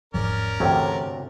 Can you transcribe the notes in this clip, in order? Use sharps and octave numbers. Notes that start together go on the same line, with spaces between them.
E1 G#2 F3 C#4 A#4 D5
D2 G2 C3 E3 A3 C#5 G5